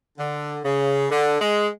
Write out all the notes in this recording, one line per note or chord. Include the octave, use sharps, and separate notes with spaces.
D3
C#3
D3
G#3